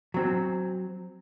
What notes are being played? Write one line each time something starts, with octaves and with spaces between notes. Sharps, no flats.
F#3 C4